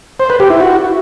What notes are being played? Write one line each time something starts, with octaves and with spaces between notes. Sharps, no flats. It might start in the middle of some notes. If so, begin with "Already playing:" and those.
C5
B4
G4
E4
F#4